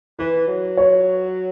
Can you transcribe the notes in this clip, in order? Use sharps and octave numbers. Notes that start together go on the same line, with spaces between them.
E3 B4
F#3
C#5